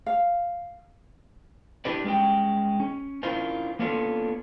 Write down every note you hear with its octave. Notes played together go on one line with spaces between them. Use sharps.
F5
D4 E4 G4 B4 D5
G3 G#3 C4 C#4 G5
C#4
C#4 D4 E4 F4 A#4 C5
A#3 B3 C#4 D4 F4 A4